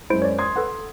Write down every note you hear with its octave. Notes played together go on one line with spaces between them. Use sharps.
F#2 G#3 E4 C5 D7
C#5 D5
C6 D#6 G#6
A4 B4 F#5